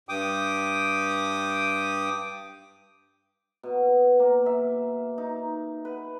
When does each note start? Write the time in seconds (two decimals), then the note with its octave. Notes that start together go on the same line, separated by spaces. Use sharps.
0.09 G2 G5 D6 D#6
3.63 B2
4.19 A#3
4.46 E5
5.18 D#4
5.85 B4